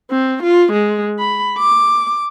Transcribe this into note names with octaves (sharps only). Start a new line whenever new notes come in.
C4
F4
G#3
B5
D6